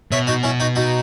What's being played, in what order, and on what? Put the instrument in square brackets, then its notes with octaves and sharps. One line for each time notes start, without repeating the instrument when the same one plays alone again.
[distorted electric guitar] B2 [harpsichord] C#5 E5
[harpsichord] D#4 F#4
C#4 E4
D#4 F#4
D#4 F#4